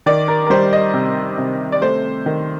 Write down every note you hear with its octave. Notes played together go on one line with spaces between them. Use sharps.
D#3 D5
A#4
A#4
G3 C5
D#5
C3
C3
D5
A3 C5
D#3